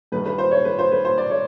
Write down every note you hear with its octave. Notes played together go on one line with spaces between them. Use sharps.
G2 D#3 B4
B4
C5
C#5
B4
C5
B4
C5
D5
C#5